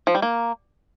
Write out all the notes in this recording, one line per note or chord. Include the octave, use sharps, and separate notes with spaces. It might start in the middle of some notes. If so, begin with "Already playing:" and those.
F3
G3
A#3